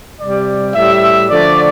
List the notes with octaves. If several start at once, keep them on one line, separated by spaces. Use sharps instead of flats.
C3 G3 D5
A2 G3 E5
D3 F3 A3 D5